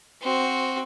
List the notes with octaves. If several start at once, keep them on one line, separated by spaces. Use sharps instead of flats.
C4 F#4